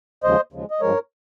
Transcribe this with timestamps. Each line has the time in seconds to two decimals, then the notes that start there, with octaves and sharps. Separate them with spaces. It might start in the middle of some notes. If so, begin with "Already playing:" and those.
0.23 D#2 C#3 F3 G#3 C5 D#5
0.53 D#2 C#3 F3 G#3
0.71 D#5
0.81 G2 F3 G#3 A#4 C#5